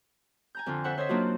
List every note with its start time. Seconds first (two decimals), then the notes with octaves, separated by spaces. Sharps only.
0.55 G#5 A#5 G6
0.66 F2 D3 F4
0.84 A4 C5 E5 F#5 F#6
0.97 C5 C#5 D#5 E5
1.09 F#3 A#3 D4 D#4 F4 F#4